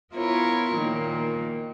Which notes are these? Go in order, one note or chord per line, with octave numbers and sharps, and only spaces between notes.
B3 E4 F4 A#4 C#5
A#2 D#3 A#3